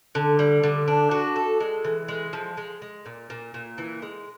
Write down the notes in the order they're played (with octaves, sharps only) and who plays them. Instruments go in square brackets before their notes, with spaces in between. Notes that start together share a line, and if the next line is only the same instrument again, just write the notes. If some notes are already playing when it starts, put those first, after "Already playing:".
[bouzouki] D3
G3
D3
D4
F#4
A4
G#3
E3
G#3
F3
G#3
G#3
A#2
A#2
A#2
E3
G#3